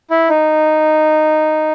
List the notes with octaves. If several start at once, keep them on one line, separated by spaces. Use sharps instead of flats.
E4
D#4